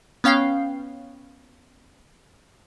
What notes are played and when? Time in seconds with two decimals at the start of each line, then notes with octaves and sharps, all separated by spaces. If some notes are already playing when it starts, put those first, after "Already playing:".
0.24 B3 C#4 F5 G5 C7